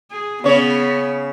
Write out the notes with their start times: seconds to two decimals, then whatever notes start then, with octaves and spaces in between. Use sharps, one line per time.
0.11 G#4
0.44 C#3 B3 C#5